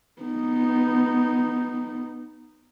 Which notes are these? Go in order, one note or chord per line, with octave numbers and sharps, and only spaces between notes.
B3 D#4